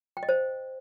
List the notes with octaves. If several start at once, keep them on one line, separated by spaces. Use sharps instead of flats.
G5
D#5
C5